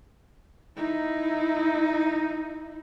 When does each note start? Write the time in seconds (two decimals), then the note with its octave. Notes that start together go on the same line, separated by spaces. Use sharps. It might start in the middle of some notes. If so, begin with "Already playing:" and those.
0.77 D#4 E4